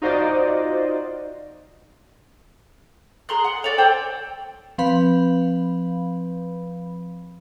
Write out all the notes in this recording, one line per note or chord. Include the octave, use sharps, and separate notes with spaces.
D#4 F4 F#4 C5 D5 D#5
G#4 A#5 C6 F#6
F#5
A4 C#5 D5
A4 C5 D5 G5
F3 C4 B4 F5 B5